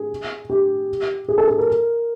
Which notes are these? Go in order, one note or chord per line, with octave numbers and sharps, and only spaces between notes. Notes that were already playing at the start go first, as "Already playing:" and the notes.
Already playing: G#4
G4
G#4
A4
A4
A#4